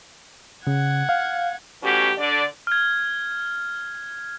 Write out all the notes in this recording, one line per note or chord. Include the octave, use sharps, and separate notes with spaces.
C#3 F#5 G#6
F5
B2 E3 A3 C#4 F#4 G4
D3 D5
F6 G#6